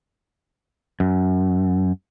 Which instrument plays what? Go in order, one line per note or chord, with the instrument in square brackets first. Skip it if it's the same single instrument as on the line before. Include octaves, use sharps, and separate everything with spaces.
[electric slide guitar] F#2